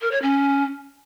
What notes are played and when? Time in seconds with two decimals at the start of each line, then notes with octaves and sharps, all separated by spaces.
0.01 A#4
0.12 C#5
0.22 C#4